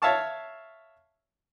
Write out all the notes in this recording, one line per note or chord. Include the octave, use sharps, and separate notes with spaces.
C#5 E5 F5 A5 C#6